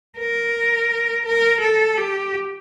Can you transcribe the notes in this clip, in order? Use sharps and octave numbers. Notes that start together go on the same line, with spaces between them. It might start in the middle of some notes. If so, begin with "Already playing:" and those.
A#4
A#4
A4
G4